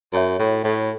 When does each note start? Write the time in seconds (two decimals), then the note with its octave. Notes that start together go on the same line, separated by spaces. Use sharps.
0.13 F#2 F#4 C#5 E5
0.39 A2
0.64 A2